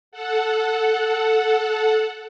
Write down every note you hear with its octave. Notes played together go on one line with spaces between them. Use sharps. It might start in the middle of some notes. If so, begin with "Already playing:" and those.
A4 F#5